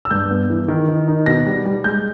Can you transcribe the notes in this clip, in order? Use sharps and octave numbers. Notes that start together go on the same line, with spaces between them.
E6
G2 G6
B3
E3
D#3
D#3
D#4
B2 A#6
G3
G3
G#3 G6